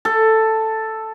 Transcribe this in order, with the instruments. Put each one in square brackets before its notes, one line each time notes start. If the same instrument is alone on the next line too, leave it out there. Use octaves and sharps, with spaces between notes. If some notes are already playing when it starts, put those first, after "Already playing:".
[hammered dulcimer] A4